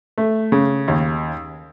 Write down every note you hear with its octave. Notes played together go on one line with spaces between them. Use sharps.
A3
C#3
D#2